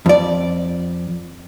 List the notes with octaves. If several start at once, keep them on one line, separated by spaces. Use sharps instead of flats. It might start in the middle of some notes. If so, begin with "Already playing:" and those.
F2 D5